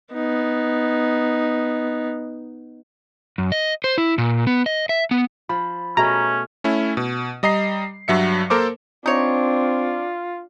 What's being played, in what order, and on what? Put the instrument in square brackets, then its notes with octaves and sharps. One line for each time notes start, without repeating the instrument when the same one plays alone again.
[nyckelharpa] B3 D#4
[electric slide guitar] F#2
D#5
C5
E4
A#2
B3
D#5
E5
B3
[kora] F3 [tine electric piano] B5
[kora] B2 A3 G#4 [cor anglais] C#4 [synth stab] A#5
[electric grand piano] A3 C#4 E4
B2
G3 D#5 A#5 C7
G2 F#3 E5 C#7
A#3 A4 A#4 C5 D6
[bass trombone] C4 [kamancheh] D4 [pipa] D#4 C#5 [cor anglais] F4